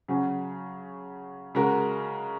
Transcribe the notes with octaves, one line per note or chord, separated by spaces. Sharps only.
C#3 F#3 C#4
C#3 G#3 F#4 A#4